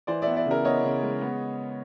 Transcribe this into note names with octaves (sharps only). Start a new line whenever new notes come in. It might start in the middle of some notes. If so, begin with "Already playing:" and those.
E3 C5 D5
B3 D5 E5
D5 E5
C#3 A#4
B3 C#5 D#5
C#3
G#3
B3